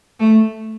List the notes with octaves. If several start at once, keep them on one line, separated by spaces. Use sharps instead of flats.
A3